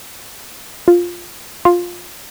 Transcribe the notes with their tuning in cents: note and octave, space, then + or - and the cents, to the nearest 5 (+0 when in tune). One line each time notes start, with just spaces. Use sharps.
F4 +5
F4 +10